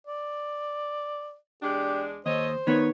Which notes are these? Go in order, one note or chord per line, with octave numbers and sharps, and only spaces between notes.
D5
E2 G#3 D4 G4
D#2 A4 C5 C#5 D#5
D#3 B3 D#4 B4 C#5